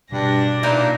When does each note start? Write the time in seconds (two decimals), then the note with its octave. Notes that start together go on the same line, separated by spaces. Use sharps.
0.12 G2 B2 D4 A#6
0.63 A#2 E3 A#3 D#4